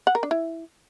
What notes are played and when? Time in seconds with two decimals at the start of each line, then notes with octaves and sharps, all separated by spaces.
0.07 F#5
0.15 A#4
0.23 D4
0.31 E4